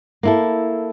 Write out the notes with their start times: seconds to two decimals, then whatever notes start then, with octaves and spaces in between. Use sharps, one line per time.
0.23 A#3 E4 A4